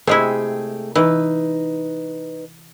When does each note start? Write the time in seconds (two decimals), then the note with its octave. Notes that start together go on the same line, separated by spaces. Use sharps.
0.07 C3 G#3 A3 E4 G#4 G5
0.95 E3 D#4 B4